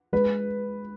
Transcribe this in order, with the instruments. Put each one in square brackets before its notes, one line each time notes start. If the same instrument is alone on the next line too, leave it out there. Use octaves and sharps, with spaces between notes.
[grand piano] G#3 B4